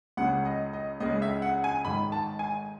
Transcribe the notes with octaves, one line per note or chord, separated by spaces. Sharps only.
C#2 C#3 G#3 C#4 F#5
D#5
D#5
C#2 C#3 G#3 C#4 D#5
E5
F#5
G#5
G#1 G#2 D#3 B5
A5
G#5